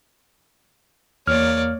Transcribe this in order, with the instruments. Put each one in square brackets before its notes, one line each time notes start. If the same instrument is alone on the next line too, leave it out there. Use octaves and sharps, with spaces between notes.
[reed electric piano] E2 F6 [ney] A#3 [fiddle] C#5 D5